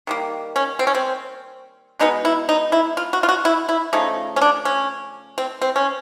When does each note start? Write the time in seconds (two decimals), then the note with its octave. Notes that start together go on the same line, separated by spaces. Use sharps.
0.07 D#3 G3 A#3
0.56 C#4
0.79 C4
0.87 C#4
0.94 C4
1.99 B2 G#3 B3 D#4
2.25 E4
2.49 D#4
2.72 E4
2.97 F4
3.13 F#4
3.23 F4
3.29 F#4
3.45 E4
3.69 E4
3.93 C#3 F3 A3 D#4
4.36 C#4
4.41 D4
4.65 C#4
5.38 C4
5.62 C4
5.76 C#4